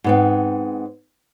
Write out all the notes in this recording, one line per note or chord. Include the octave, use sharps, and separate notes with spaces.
G#2 B3 C4